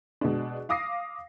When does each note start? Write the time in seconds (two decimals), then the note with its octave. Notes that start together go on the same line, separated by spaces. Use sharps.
0.21 B2 G#3 D4
0.69 F5 D6 D#6 A#6 C7